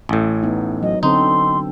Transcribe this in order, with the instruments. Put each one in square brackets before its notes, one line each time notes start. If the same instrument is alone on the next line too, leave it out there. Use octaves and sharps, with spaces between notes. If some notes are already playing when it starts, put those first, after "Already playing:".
[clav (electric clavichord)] A1 A2
[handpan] B3 D#4
[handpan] F#3 [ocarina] D#5
[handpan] D3 C4 A4 [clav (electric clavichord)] D#4 [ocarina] C6